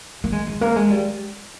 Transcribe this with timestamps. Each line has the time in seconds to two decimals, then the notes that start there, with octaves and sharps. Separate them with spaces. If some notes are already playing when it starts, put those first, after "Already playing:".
0.24 A#3
0.32 G#3
0.47 G#3
0.61 A#3
0.76 G#3
0.90 G3